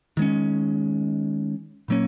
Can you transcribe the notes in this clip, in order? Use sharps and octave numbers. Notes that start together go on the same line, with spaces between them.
D#3 G#3 C#4
A#2 F#3 A#3 C#4